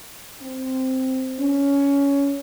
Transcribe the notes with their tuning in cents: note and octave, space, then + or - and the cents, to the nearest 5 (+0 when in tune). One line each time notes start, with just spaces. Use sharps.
C4 -5
C#4 +15